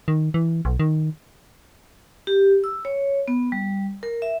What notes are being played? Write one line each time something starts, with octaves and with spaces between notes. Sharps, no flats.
D#3
E3
B1
D#3
G4
E6
C#5
B3
G3
A#4
E5